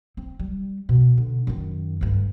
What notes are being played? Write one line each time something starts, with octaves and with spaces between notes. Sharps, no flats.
C4
G3
B2
D3
F#2 D#3
D2 G2